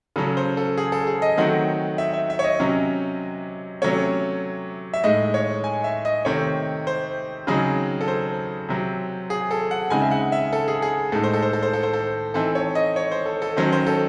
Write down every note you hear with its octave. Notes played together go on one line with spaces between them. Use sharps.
C#3 F#3 C#4 A4
C5
A4
G#4
A4
G#4
D#5
D#3 F#3 A3 C4 D#4 F#5
E5
E5
E5
C#5
D#5
C3 F#3 C#4
C3 F#3 A3 C#4 C#5
E5
A2 G#3 D#4 D#5
C#5
G#5
E5
D#5
C3 D#3 A3 C4 C#5
C5
C#3 F#3 C4 D#4 G#4
A4
C5
C3 F#3 C4
G#4
A4
F#5
C#3 G#3 C4 D#4 G#5
E5
F#5
E5
A4
G#4
G#4
A2 G#3 D#4 A4
C5
A4
C5
A4
C5
A4
C5
A4
E3 C4 D#4 A4
C#5
D#5
C#5
C5
A4
A4
D#3 F#3 C#4 C5
C5
A4